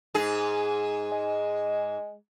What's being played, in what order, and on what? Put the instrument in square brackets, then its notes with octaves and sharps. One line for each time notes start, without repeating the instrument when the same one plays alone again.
[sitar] G#2 G#4
[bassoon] G#3